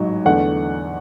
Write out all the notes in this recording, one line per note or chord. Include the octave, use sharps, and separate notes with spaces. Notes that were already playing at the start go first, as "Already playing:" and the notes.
Already playing: A1 G#2 F#3
E2 D3 A3 F#5